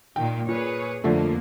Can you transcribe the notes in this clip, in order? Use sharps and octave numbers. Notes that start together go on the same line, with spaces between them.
A#2 D#3 G5
A#2 G#4 B4 C#5
F2 D3 F3 A3 A#3